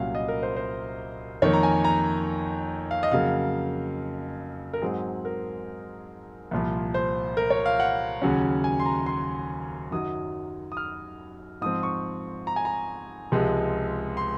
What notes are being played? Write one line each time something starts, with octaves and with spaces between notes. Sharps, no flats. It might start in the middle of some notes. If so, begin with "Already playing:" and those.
Already playing: C2 A#2 F#3 C#4 F5
D#5
A#4
C5
C5
F2 D#3 A#3 C#5
A#5
G#5
A#5
F5
D#5
F2 C#3 F#3 A#3 F5
A#4
G#2 F#3 C4 G#4
A#4
C2 A#2 F3
C5
A#4
C#5
F5
F#5
D#2 C#3 F#3 C#4
G#5
C6
A#5
C6
F#2 D#3 F#3 D#6
D#6
F6
G#2 F3 C4 D#6
C#6
A#5
G#5
A#5
C#2 C3 F3 G#3
C6